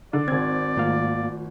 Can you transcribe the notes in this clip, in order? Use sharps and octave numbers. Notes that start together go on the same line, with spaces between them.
D3 D5
G#1 C4 G#6 A6
G#2 D#3 A3 A#3 F4 F5